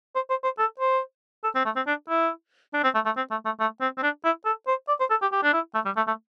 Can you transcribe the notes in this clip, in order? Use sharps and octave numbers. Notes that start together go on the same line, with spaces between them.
C5
C5
C5
A4
C5
A4
C4
A3
C4
D4
E4
D4
C4
A3
A3
C4
A3
A3
A3
C4
C4
D4
E4
A4
C5
D5
C5
A4
G4
G4
D4
E4
A3
G3
A3
A3